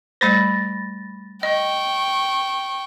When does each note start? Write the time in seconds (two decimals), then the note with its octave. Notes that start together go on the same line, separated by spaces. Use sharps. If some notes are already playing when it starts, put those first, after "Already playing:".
0.21 G3 A3 C5 B5 A6 A#6
1.43 D#5 G5 C#6